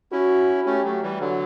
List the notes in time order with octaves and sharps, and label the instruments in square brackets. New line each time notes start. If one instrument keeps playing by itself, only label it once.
[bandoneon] C#4 E4 [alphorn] F#4
[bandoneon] A3 C#4 [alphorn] G4
[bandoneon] F#3 A3
E3 G3
D3 F#3